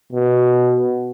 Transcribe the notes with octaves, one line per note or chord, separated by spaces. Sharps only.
B2